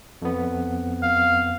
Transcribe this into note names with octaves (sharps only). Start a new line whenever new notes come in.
F2 B3
F5